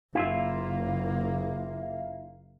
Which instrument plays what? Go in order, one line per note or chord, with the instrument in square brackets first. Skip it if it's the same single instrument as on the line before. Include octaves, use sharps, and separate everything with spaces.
[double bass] F#1 A#3 [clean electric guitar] E4 F4 E5